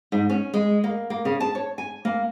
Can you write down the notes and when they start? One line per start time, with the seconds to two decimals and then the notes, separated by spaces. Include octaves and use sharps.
0.12 G#2
0.29 C#4
0.54 G#3
0.84 A#3
1.10 A#3
1.25 C#3
1.40 A5
1.55 C#5
1.78 G#5
2.05 A#3